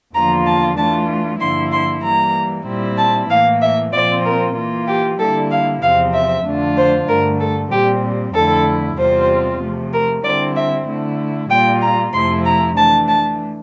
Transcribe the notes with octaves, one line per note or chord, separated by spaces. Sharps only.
E2 D3 F3 A#3 F4 A#5
A5
E3 A3 D4 F4 A5
G2 D3 F3 A#3 E4 C6
C6
E3 G3 A#3 A#5
A#2 G3 C4 E4
A5
A2 E3 A#3 F5
E5
A#2 F3 C4 F4 D5
A#4
E3 A#3 F4
G4
D3 G3 A#3 E4 A4
F5
E2 C3 F3 C4 F5
E5
F2 D3 A3 D4 F4
C5
G2 D3 A3 A#4
A4
A#2 G3 C4 G4
F2 D3 A3 E4 A4
E2 C3 G3 C4 F4 C5
C3 F3 A3
A#4
D3 G3 C4 E4 D5
E5
D3 A3 E4
A#2 G3 A#3 F4 G5
A#5
F2 C3 F3 A3 E4 C6
A#5
E3 A3 D4 A5
A5